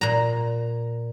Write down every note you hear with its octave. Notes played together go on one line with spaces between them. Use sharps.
A#2 A#5